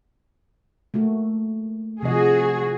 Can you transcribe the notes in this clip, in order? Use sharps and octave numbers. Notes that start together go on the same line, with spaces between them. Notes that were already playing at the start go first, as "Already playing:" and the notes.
A3 A#3 F#4
C3 F3 F#4 G#4 D#5